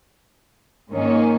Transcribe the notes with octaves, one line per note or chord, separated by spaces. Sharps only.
G#2 D#3 A#3 C#4